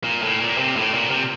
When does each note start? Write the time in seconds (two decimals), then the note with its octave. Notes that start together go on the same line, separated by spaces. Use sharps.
0.04 A#2
0.22 A2
0.40 A#2
0.58 C3
0.76 A2
0.94 A#2
1.11 C3